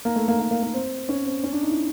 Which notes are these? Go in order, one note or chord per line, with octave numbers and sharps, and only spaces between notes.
A#3
A3
A#3
A#3
A#3
A#3
C4
C#4
C4
C#4
D4
D#4
E4